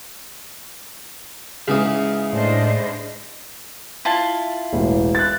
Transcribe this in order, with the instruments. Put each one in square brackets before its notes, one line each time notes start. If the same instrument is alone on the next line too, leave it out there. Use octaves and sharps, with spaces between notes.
[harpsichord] G#2 E3 D#6 [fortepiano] C#3
[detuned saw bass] A2 [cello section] D4 C5 D#5
[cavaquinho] E4 F4 A5
[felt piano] E1 A1
F#6 A6